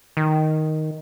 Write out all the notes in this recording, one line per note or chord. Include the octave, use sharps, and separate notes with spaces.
D#3